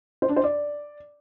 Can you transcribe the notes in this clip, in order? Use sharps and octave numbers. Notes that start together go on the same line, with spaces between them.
C5
D4
C5
D5